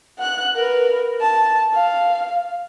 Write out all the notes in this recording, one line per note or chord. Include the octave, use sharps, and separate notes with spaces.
F#5 F#6
A#4 B4
A5
F5